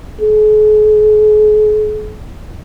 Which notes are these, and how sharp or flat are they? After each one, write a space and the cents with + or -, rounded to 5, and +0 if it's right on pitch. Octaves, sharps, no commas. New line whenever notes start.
G#4 +45